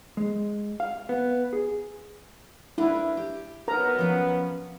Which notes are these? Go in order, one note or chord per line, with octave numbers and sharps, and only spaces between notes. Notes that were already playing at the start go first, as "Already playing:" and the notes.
G#3
F5
B3
G#4
D4 E4 A#4 B4
G4
F#3 B3 A#4 A#5
F3 C#4